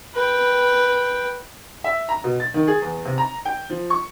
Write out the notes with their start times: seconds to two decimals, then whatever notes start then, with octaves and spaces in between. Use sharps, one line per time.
0.15 B4 G5
1.84 E5
2.09 A#5
2.24 B2
2.40 A6
2.54 D#3
2.68 G#4
2.82 E2
3.05 C3
3.18 A#5
3.45 G5
3.70 F3
3.90 C#6